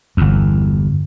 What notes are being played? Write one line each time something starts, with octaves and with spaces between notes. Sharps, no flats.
G1 E2